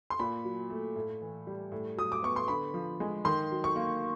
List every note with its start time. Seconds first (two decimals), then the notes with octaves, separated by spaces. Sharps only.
0.10 C6
0.19 A#2 B5
0.44 F#3
0.70 A3
0.96 A2
1.22 E3
1.47 G3
1.72 A2
1.97 F#3 D#6
2.12 D6
2.22 B3 C#6
2.36 C6
2.48 D3 B5
2.74 F3
3.00 G#3
3.25 D#3 C6
3.51 F#3
3.64 C#6
3.76 A#3